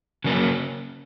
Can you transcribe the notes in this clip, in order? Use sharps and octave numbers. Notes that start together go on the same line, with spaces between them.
C#3 F#3 A#3 C#4